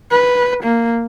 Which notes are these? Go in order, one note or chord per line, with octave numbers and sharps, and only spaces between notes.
B4
A#3